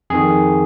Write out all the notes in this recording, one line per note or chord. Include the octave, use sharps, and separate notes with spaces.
F2 D#3 G#4